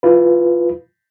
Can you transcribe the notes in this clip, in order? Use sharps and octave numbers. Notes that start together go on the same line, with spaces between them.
E4 F4 B4